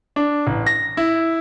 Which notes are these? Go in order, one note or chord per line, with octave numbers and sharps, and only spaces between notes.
D4
A1
A#6
E4